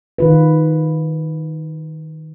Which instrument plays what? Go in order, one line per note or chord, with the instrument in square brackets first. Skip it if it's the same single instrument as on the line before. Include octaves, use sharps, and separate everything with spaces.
[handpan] D#3 F4 B4